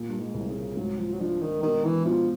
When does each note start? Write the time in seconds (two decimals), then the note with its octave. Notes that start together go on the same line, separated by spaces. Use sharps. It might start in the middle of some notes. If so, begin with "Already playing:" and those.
Already playing: A#2
0.09 G2
0.19 G#2
0.34 C2
0.48 C#3
0.77 G#2 F#3
0.98 F3
1.13 F#3
1.19 F3 D4
1.42 D#3
1.63 B2 D#3
1.84 E3
2.06 B2 F3